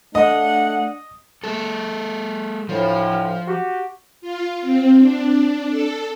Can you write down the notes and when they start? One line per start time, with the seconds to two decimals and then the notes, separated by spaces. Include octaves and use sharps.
0.15 A3 D4 D#5 F#5
1.44 G#3 A4
2.69 D2 A2 F3
3.47 F#4 G4
4.21 F4
4.61 C4
4.99 D4
5.70 A4